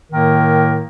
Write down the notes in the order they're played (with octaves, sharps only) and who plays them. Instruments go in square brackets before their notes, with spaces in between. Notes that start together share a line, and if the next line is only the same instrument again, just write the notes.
[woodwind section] A2 D#3 A#3 A#4